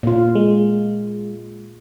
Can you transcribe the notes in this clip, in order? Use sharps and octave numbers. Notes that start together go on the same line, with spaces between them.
A#2 F4
G#3